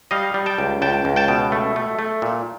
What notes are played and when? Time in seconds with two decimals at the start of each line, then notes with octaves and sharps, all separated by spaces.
0.11 G3 D#5 F5
0.34 G3
0.46 G5 A5
0.58 C#2
0.82 C#2 G5 A5
1.05 C#2
1.16 G5 A5
1.28 B2
1.52 A3
1.76 A3
1.99 A3
2.22 A#2